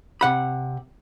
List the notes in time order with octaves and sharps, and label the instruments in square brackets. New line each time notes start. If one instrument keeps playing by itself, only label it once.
[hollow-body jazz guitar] C3 F#5 B5